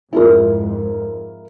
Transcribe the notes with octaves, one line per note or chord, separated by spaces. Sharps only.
F2 G#2 E4 F4 A#4